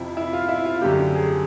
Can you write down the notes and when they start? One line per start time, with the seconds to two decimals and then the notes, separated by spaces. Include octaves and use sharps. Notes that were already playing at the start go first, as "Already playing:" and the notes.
Already playing: F2 C3 F3 E4
0.17 E4
0.33 F4
0.49 E4
0.65 F4
0.81 F#2 D3 G3 G4
1.15 G#4